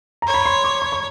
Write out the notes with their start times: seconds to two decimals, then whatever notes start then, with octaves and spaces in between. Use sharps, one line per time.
0.22 A#5
0.27 C#5
0.34 B5
0.46 C6
0.64 D6
0.82 C#6
0.92 C#6